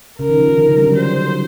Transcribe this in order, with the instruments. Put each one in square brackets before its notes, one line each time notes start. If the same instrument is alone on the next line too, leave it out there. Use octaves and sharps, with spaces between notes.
[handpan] C#3 [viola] A#4
[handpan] D#3
F3
D#3
D3
C#3
G3
F#3
[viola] C5